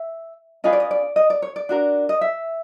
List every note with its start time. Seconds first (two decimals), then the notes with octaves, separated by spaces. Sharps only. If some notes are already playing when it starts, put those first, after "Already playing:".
Already playing: E5
0.64 C#4 F4 G#4 B4 D#5
0.73 D5
0.80 D#5
0.91 D5
1.16 D#5
1.30 D5
1.42 C#5
1.56 D5
1.69 D4 F#4 A#4
2.09 D#5
2.21 E5